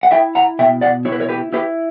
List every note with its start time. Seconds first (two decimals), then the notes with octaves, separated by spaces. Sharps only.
0.03 F#5
0.11 E4 E5 G5
0.35 F#5 A#5
0.59 B2 E5 G5
0.81 D5 F#5
1.05 E4 C#5
1.12 B4
1.20 A#4 C#5
1.29 G4 B4
1.53 E4 G4 B4